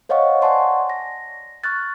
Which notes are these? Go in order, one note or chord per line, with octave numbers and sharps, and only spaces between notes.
C5 C#5 D#5 F5 F#5 C#6
D5 F#5 G#5 A5 C6 C#6
A#6
C#6 F6 F#6 A6